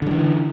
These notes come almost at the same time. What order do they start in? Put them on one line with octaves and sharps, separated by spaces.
D3 G3 E3